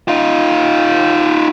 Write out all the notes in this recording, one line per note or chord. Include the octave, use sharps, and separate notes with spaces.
D#4 F4